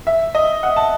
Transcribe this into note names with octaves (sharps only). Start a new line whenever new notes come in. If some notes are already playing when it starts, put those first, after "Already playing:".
E5
D#5
F#5
A5